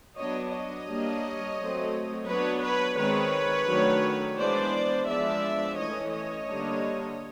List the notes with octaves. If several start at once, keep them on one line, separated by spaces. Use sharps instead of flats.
F#3 B3 D4 C#5 D#5
C#5 D#5
G3 A#3 D4
F#3 A3 C4
F#3 B3 D4 B4 C#5
B4 C#5
D#3 G#3 C4 B4 C#5
D#3 F#3 A3 D4
E3 G#3 B3 D4 C5 D5
F3 G#3 B3 D4 D5 E5
E3 A3 C#4 C#5 D#5
C#5 D#5
D3 G3 A#3 D4